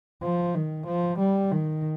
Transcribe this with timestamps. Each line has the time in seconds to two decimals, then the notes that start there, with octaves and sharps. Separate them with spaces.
0.23 F3
0.54 D#3
0.87 F3
1.19 G3
1.51 D#3